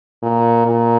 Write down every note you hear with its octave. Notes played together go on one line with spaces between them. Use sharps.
A#2
A#2